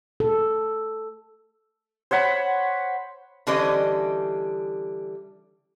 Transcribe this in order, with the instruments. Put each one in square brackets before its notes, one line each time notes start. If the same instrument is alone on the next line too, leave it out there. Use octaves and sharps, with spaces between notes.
[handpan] A4
[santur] C5 C#5 F#5 B5
[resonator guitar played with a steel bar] D3 E3 G3 C#4 C5 D#5